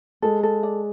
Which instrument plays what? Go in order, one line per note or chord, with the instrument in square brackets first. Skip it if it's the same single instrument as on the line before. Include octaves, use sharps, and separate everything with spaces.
[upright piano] G#3 [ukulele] A4
[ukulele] A4
D5